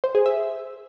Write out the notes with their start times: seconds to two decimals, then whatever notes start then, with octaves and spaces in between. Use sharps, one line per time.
0.04 C5
0.15 G#4
0.26 E5